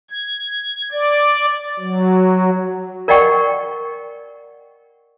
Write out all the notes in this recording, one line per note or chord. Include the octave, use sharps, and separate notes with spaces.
G#6
D5
F#3
A#4 D5 D#5 F#5 G5 C#6